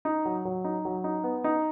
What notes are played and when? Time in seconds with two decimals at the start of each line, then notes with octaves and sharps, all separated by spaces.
0.05 D#4
0.25 F#3
0.45 F#3
0.64 D#4
0.85 F#3
1.04 D#4
1.24 B3
1.44 D#4